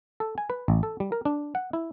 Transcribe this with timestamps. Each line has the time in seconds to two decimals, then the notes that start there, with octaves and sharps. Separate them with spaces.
0.20 A4
0.38 G#5
0.50 B4
0.68 A1
0.83 A4
1.00 G3
1.12 A#4
1.25 D4
1.55 F#5
1.73 E4